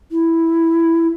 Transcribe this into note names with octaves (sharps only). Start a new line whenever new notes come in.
E4